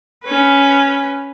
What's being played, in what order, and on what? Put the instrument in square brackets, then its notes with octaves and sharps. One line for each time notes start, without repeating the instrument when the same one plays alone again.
[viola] C#4 B4